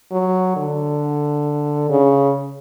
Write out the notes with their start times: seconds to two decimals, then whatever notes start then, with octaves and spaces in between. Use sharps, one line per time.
0.12 F#3
0.56 D3
1.89 C#3